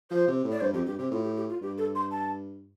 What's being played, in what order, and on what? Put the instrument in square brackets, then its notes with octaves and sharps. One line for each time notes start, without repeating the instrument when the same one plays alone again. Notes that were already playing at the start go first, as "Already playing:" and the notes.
[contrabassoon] F3 [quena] C5
[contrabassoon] C3
A2
[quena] D5
[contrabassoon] G2 [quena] C5
[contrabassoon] F2 [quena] G4
[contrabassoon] G2 [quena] G4
[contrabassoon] C3 [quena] G4
[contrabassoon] A2 [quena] F4
[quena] G4
G4
F4
[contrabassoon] G2 [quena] G4
[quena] A4
C6
A5